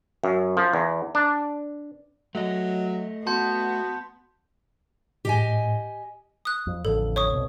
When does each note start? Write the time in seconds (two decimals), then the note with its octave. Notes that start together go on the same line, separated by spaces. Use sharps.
0.24 F#2
0.57 F3
0.74 E2
1.15 D4
2.35 F#3 A3 D#5
3.27 B3 F#4 A5 C6 G6
5.25 A2 G4 D#5 G#5
6.45 D#6 F#6
6.67 F2
6.85 A1 F2 D3 A4
7.16 C#5 C#6 D#6
7.33 C2 B2